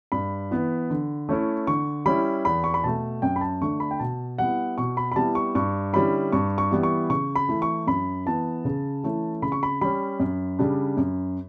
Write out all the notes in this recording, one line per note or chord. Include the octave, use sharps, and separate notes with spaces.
G2 B5
E3 B3
D3
A3 C#4 E4
D3 C#6
G3 C#4 E4 B5
E2 B5
C#6
B5
B2 A3 A5
F#2 G5
B5
A5
D3 A3 D4 C#6
B5
G5
B2 A5
G3 B3 E4 F#5
B2 C#6
B5
B5
G3 B3 E4 A5
C#6
G2 C#6
D3 G3 C#4 E4 B5
G2 C#6
C#6
E3 G3 B3 E4
C#6
C#3 C#6
B5
E3 A3 E4
C#6
F#2 B5
E3 B3 A5
C#3
E3 A3 C#4 E4
C#3 B5
C#6
B5
G3 C#4 B5
F#2
C#3 G3 D4
F#2